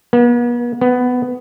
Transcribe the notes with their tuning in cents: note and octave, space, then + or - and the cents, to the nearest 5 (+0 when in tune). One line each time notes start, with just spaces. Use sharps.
B3 -45
B3 +10